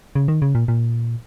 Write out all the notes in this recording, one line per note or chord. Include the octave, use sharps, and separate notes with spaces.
C#3
D#3
C#3
A#2
A#2